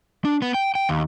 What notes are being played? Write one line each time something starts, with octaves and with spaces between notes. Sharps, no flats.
D4
B3
G5
G5
D#2